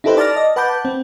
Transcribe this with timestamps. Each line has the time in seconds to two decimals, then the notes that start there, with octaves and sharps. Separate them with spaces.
0.04 D#4 E4 G4 A4 B4 C5
0.17 D5 A5 D6 F6 A#6
0.36 D#5
0.56 B4 F#5 A5 B5 D6 G6
0.85 C4